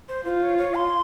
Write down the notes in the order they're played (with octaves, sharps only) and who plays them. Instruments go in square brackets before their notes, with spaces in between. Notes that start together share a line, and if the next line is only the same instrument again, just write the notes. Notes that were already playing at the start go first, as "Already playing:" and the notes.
[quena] C5
[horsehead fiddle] F4 [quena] C5
[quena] C#5
C#5
C6